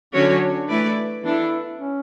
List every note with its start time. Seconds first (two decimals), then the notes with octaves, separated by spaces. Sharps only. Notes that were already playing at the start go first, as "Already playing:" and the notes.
0.13 D3 F#3 C#4 D4 F#4 C#5
0.68 E3 A3 E4 B4 D5
1.23 E3 B3 D4 E4 A4
1.77 C#4